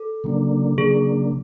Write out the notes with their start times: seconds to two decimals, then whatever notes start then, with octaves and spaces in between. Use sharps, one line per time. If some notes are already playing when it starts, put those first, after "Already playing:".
Already playing: A4
0.24 C#3 F#3 A#3 D4
0.78 C#3 F#3 A#3 D4 G#4